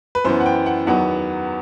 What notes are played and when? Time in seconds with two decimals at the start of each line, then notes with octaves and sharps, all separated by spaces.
0.15 B4
0.25 F#2 E3 B3 C5
0.40 F#5
0.46 G5
0.66 F#5
0.87 E2 D#3 F#3 B3 F#5